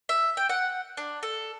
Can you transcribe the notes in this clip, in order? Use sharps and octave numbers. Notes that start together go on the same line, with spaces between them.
E5
G5
F#5
D4
A4